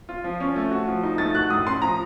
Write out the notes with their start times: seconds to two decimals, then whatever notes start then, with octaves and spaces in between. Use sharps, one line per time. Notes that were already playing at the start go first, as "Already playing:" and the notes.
0.09 F4
0.24 F3
0.40 C#4
0.56 A3
0.71 F#4
0.88 F3
1.03 D#4
1.18 A3 A6
1.35 F#4 F#6
1.50 A2 D#6
1.66 C#4 C6
1.82 F3 A#5